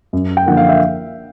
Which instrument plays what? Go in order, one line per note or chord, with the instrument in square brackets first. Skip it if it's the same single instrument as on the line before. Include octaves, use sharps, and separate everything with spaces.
[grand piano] F#2
G5
D3 F3 A#3 F#5
F5
E5